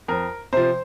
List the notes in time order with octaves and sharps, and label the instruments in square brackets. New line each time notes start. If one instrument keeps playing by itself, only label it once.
[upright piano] F2 A#4
C3 F3 C5